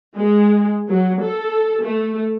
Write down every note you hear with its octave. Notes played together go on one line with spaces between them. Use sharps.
G#3
F#3
A4
A3